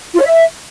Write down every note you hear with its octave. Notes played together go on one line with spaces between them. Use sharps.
F4
C#5
E5